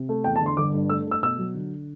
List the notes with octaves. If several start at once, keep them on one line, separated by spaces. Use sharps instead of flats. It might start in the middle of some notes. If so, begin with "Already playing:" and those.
Already playing: C3
A3
E2 G5
A5
D3 C6
G1 D6
G2
A3 E6
A3
E6
B2 E6
F#3
D3